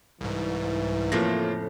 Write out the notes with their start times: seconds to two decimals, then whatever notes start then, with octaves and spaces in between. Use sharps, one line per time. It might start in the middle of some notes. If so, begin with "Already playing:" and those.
0.21 C2 G#2 E3
1.12 F2 A2 C#3 A#3 F4 A#6